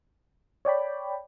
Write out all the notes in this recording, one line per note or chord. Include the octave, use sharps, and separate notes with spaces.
C#5 D5 G5 B5